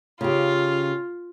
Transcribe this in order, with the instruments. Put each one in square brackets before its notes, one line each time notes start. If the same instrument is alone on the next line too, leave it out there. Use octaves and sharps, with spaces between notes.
[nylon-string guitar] C#3 G4 [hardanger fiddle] F4